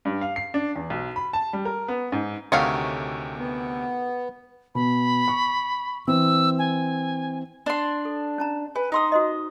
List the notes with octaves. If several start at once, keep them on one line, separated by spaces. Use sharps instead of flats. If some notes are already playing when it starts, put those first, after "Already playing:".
G2
F5
C7
D4
E2
B1
B5
A5
G3
A#4
B3
G#2
D2 C3 D#3 A3 F#4 G4 C#5 F5
B3
B2 B5
C#6
E3 C4 E6
G#5
D4 C6
A4
C#4 A5 A#5
B4 G#5
D#4 C6 D#6
F#4 C5 D#5